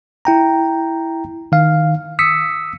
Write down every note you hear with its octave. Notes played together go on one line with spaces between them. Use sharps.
E4 G5 A#5
D#3 F5
D#6 E6 B6 C#7